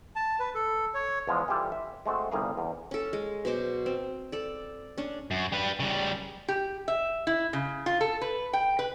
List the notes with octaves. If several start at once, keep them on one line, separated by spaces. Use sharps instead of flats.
A5
B4
A4
C#5
E2 E3 F3 G#3
E3 G3 F4 G4 A4
E5
G#3 A3 C4 F#4 A4
G1 C2 G3 G#4 A#4 F5
E2
C#4 A4
G#3
B2 F#3 C5 D6
C4
A4 D5
C#4 D4
F#2
G3 B4
C#3 G3
G4
E5
E4
C#3
F4
A4
B4
G5
B4